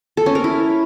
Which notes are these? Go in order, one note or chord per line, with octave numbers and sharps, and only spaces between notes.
A4
C#4
A#4
E4